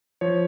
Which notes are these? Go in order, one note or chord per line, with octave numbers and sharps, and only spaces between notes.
F3 C#5